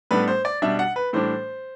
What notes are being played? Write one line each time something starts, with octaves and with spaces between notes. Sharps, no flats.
A2 G3 B3 D4 B4
C5
D5
B2 G3 D4 E5
F#5
B4
A2 E3 G3 D4 C5